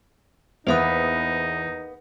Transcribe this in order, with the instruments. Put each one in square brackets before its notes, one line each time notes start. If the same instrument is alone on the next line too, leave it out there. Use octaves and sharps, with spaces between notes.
[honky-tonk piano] E2 [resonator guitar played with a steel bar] A#3 B3 B4 [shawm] D#4 [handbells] C5 E5 D#6